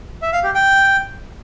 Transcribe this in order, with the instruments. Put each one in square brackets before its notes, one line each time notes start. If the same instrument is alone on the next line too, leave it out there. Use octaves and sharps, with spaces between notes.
[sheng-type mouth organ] E5
F5
G4
G5